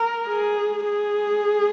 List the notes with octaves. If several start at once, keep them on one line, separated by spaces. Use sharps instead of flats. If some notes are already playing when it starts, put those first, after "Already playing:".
Already playing: A#4
G#4
G#4